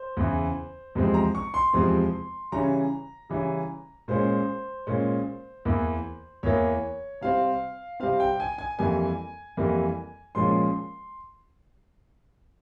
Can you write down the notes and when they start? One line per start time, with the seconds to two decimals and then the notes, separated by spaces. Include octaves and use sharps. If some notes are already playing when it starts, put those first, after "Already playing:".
Already playing: C5
0.17 E2 C#3 E3
0.95 E2 C3 F3 G#3 C4
1.14 A#5
1.35 C#6
1.54 C6
1.73 E2 C3 F3 G#3 C4
2.52 C#3 E3 G3 C#4 A#5
3.30 C#3 E3 G3 C#4
4.08 A#2 G#3 C#4 C5
4.87 A#2 G#3 C#4
5.65 E2 E3 A#3
6.43 E2 E3 A#3 C#5
7.21 C3 G3 C4 F5
8.00 C3 G3 C4 F5
8.20 G5
8.40 G#5
8.58 G#5
8.79 F2 E3 G3 A#3 G#5
9.57 F2 E3 G3 A#3
10.35 A#2 F3 G#3 C#4 C6